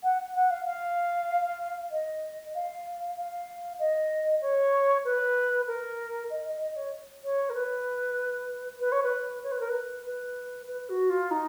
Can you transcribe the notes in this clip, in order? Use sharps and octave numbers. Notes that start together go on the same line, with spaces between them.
F#5
F#5
F5
F5
D#5
F5
F5
D#5
C#5
B4
A#4
D#5
D#5
D#5
C#5
C#5
A#4
B4
B4
C#5
B4
C#5
B4
A#4
B4
B4
B4
F#4
F4
D#4